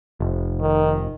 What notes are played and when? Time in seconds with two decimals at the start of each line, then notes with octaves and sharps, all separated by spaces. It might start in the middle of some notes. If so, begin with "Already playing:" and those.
0.20 F1
0.61 D#3